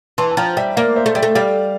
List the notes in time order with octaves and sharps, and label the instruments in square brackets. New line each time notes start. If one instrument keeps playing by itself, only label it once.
[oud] E3 [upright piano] A5 C6
[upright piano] A5
[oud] F3 [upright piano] G5 A#5
[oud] G3 [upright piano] E5 G5
[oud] A#3 [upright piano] D5 F5
[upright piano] C5 E5
[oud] A3
[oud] G3 [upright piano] E5 G5
[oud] A3
[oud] G3 [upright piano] D5 F5